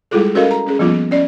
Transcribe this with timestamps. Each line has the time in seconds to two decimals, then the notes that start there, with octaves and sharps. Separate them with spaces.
0.11 G3 G#3 E4 F4 G#4 A4
0.35 C#4 F#4 A4 A#4 D#5 F5
0.51 A#5
0.66 C#4 G#4
0.79 F3 G3 A#3 B3 C#4 F4
1.11 C#4 D5 D#5